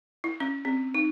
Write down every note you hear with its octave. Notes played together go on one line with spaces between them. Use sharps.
E4
C#4
C4
D#4